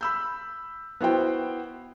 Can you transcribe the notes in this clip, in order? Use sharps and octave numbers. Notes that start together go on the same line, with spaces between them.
B5 E6 G6
B3 E4 F#4 C5 G5